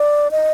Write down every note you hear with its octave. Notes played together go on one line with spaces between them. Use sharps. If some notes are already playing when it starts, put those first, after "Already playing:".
Already playing: D5
D#5